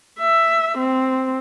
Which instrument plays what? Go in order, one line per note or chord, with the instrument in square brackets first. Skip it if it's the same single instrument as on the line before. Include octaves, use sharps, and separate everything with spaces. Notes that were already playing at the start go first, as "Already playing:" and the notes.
[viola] E5
C4